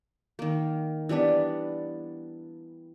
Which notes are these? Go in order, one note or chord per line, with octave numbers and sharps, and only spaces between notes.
D#3 A#3
E3 G3 B3 D4